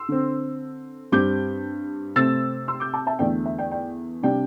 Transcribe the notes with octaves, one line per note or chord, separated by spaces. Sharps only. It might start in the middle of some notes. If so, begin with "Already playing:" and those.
Already playing: C6 E6
D3 C4
G2 G3 C4 D6 G6
C3 A3 C4 E6 A6
C6 E6
D6 G6
A5 D6
E5 A5
E2 D3 A3 D5 G5
E5
D5 G5
D5 G5
C3 G3 D4 D5 G5